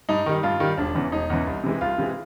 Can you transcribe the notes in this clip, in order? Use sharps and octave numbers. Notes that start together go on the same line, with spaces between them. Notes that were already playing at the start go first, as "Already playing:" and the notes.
G2 D#4
D#3 G3
G2 F4
D#3 G3
E1 D4
E2 C#3 E3
E1 D#4
E2 C#3 E3
C2
C3 E3 G#3
C2 F4
C3 E3 G#3